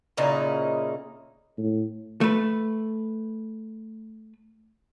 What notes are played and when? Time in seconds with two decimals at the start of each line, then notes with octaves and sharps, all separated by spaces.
0.17 A#2 C#3 D#4 E4
1.58 A2
2.21 A3 B4